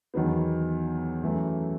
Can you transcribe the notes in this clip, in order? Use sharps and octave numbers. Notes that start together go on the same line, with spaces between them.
E2 D#3 F#3 B3
F#2 E3 A3